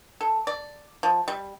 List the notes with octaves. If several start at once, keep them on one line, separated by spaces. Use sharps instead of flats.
A4
D5
F3
G3